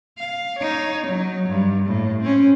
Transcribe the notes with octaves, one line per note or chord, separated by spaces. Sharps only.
F5
D#4 C#5
F#3
G2
A2
C4 C#4